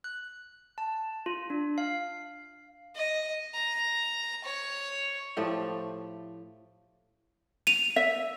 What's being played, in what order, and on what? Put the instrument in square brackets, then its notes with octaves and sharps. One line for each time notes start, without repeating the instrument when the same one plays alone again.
[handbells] F#6
A5
F4
D4
F5
[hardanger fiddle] D#5
A#5
C#5
[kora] A2 F3 A3 G4
[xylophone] D#7 F7
[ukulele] E5